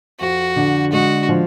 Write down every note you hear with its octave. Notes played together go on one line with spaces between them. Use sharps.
F2 F#4
D3
G#3 F#4
F3